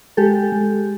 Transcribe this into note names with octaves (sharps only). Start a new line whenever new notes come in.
G#3 G4 A4
G#3